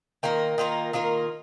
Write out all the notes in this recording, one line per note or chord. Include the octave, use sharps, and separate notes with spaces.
D#3 A#3 F4 A#4
D#3 A#3 F4 A#4
D#3 A#3 F4 A#4